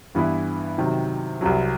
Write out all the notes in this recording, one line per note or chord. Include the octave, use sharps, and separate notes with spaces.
G2 E3 B3 E4
C3 D#3 F#3
C2 C3 F#3